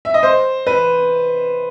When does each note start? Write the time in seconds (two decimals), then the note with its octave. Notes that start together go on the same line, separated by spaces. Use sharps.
0.05 E5
0.14 D#5
0.23 C5
0.67 B4